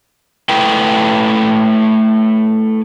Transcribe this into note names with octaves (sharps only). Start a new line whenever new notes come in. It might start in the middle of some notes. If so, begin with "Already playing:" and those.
A3 E4 B4 G5